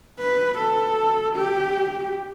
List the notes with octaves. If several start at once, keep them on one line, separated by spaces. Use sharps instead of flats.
B4
A4
G4